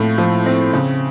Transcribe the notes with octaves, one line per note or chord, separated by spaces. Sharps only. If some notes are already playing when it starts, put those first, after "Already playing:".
Already playing: A2 F3 A3 C4
F3
C4
C#3